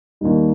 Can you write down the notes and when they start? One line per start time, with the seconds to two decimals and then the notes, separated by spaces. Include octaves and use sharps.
0.21 D#2 D#3 G3 D#4